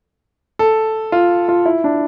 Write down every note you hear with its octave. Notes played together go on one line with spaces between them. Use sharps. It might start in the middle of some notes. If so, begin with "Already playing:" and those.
A4
F4
F4
E4
D4